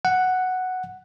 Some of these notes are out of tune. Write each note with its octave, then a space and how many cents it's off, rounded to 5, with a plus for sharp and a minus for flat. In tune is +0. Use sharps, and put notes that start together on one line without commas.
F#5 +0